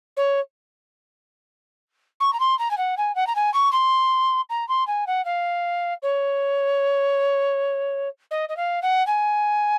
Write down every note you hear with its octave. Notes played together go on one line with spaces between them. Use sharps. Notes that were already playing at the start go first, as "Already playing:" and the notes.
C#5
C#6
A#5
C6
A#5
G#5
F#5
G#5
F#5
A#5
G#5
C#6
C6
A#5
C6
G#5
F#5
F5
C#5
D#5
D#5
F5
F#5
G#5